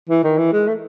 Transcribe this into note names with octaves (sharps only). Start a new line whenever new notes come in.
E3
D#3
E3
G#3
A3